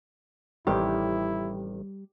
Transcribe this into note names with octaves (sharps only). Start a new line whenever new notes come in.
A1 C3 D#3 G3 E4 G4